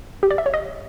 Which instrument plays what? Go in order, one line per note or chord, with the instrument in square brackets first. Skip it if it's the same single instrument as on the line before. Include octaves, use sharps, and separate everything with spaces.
[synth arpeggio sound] G4
D5
E5
C#5
D#5